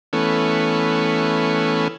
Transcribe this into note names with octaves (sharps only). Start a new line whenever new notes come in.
E3 A3 B3 C#4